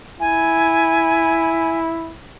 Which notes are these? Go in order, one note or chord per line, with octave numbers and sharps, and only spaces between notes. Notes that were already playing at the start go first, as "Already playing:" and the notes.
E4 G#5